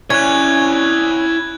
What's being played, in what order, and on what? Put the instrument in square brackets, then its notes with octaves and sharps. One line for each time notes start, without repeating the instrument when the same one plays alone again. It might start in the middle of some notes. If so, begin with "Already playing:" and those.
[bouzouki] C#4 [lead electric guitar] E4 D5 [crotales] F#6 G#6